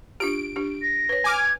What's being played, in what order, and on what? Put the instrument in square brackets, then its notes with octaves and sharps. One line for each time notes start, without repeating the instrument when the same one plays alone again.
[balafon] D4 F4 G4 [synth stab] D7
[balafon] D4 G4
[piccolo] A#6
[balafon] B4 C#5
[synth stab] G#5 D6 F6
[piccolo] G#6